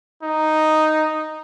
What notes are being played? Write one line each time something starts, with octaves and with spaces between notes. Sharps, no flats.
D#4